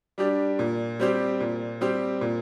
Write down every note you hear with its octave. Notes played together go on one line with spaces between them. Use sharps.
G3 D4 G4
A#2
G3 C4 G4
A#2
G3 C4 G4
A#2